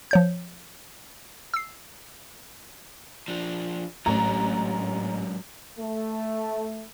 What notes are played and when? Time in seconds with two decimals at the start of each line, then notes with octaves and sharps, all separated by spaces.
0.11 F3 C#5 G6
1.54 E6 C7
3.28 F3 D4
4.06 A1 G#2 F#3 A#5
5.79 A3